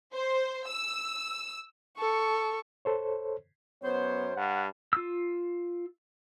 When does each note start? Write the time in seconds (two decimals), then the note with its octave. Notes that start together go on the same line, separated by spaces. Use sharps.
0.13 C5
0.68 E6
1.97 A4 C#6
2.85 A4 C5 C#5
3.83 F#2 B3 C5 C#5
4.37 G2 F#5
4.93 F4 E6